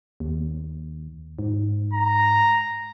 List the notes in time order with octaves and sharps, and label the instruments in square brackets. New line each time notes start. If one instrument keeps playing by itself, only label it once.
[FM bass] D#2
G#2
[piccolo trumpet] A#5